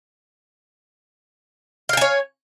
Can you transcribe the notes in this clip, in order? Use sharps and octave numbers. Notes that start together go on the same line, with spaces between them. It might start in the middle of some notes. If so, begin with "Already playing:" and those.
C#5 F5 G5 G#5